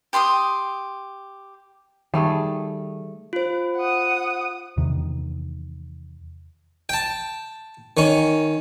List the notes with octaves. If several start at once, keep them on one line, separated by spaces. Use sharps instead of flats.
G4 C6 D6 D#6
D#3 G3 A3 G#4
F4 C5
F#5 D#6
E2 C3 D#3
G5 A5
D#3 C#4